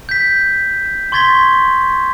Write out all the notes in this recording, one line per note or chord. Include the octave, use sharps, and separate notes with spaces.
G6 B6
C6 C#6 G#6 A6 B6 G7